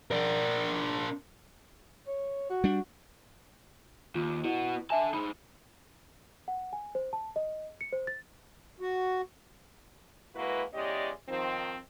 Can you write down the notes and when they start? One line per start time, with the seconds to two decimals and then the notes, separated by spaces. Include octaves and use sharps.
0.11 D4 A#4
2.07 C#5
2.50 F#4
2.64 G3 D4
4.15 D#2 F4
4.45 B3 E4 F#4
4.90 D3 E5 G#5 A5
5.14 G#3 D#4 B5
6.48 F#5
6.73 G#5
6.95 C5
7.13 A5
7.36 D#5
7.81 C#7
7.93 C5
8.07 A6
8.80 F#4
10.36 G#3 A#3 E4 F#4 B4
10.74 E2 G#3 C#4 G4 D5 D#5
11.28 D#3 F3 C4